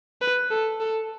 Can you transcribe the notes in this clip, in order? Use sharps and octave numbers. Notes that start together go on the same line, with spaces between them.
B4
A4
A4